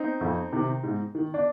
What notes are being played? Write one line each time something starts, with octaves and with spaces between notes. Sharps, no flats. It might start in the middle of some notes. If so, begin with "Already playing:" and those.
Already playing: C4 D#4
F2
C3 D#3
G#2
D#3
D4